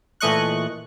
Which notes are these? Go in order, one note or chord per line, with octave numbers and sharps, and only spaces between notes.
A#2 E3 A3 D#5 C#6 F#6